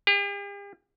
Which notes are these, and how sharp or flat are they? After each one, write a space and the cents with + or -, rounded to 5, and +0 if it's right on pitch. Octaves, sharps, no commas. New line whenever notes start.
G4 +45